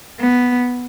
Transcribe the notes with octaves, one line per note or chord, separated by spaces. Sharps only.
B3